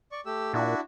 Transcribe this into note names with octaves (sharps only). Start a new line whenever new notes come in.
D5 C#6
A3 G4 E6
A#2 D4 E4 F#4